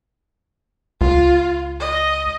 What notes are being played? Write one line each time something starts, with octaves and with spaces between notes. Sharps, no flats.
C#2 F4
D#5